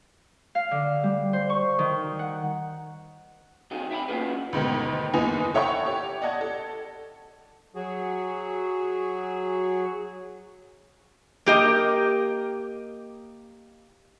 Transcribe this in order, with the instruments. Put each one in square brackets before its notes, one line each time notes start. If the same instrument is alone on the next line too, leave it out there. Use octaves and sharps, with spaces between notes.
[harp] F5
D3
G3
C5
C#6
D#3
F#5
[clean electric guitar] C3 D#4 F#4 G#4
E5 G5 A#5 B5
A#3 C#4 F4 F#4 G#4 B4
[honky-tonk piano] D2 G#2 B2 D#3
F#1 E2 E3 D#4 G#5 F7
A4 C#5 E5 F#5 G5 C#6
G4 C#5
D5 D#5 F#5 A5 G#6
A4
[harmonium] F#3 F#4 G#4
[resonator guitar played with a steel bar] A#3 G4 D#5